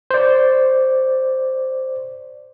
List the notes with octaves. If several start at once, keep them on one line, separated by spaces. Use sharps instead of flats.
C5 D5